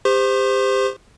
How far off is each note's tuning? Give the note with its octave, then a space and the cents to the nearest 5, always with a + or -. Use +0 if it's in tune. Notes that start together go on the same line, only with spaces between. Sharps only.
G4 +30 C5 -20 C6 +40